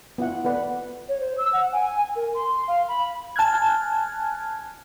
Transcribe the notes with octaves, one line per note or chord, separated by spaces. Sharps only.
B3 E4 F4 F#5
B3 A4 B4 D5 F#5
C#5
C5
E6
F#5
G#5
G#5
A#4
C6
F5
B5
G#5 A5 F6 F#6 G#6